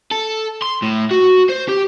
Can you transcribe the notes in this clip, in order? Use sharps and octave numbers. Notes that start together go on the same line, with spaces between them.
A4
C6
A2
F#4
C5
G4